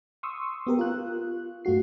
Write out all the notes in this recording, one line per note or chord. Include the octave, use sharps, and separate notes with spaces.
C6 C#6 D#6 E6
B3 G4 A#4
F4 F#6
G2 A3 F4 F#4 C7